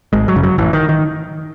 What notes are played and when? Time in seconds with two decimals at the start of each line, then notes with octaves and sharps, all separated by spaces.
0.13 G#1 G#3
0.28 F#3
0.36 F#2 C#3
0.43 F#3
0.58 A1 E3
0.73 D#3
0.89 D#3